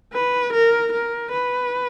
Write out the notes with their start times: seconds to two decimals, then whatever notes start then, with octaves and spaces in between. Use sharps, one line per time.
0.13 B4
0.53 A#4
0.92 A#4
1.31 B4